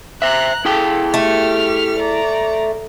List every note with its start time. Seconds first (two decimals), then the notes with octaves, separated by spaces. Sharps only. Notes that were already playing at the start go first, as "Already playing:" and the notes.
0.22 C5 E5 A#5 F#6
0.65 E4 G#4 A4 G5
1.14 A3 G4 F6
2.00 D5 A#5